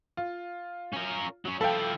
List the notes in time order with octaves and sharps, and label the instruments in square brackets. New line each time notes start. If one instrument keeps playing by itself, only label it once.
[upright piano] F4
[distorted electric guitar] C#4 A#4
F#3 C#4
[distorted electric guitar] F3 E4 [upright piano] A4 F5 G5